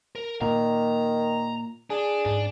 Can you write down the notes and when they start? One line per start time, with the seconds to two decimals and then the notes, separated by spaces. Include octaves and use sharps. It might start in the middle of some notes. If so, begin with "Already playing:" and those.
0.15 A#4
0.41 A#2 D#3 A#3 A#5
1.90 D4 G#4
2.26 G#2 D4